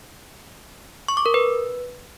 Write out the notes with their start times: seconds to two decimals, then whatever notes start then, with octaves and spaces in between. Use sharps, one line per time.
1.08 C#6
1.17 D6
1.26 A#4
1.34 B4